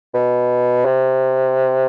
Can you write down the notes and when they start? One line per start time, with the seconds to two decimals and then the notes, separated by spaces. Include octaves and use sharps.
0.14 B2
0.85 C3